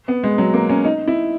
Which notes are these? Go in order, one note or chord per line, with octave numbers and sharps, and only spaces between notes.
B3
G#3
F#3
A#3
C#4
D#4
E4